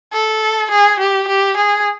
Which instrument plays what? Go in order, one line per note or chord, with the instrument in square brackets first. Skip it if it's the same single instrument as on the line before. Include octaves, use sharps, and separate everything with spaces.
[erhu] A4
G#4
G4
G4
G#4